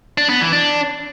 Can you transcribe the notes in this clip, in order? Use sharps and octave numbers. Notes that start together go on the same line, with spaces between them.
D4
B3
E3
D4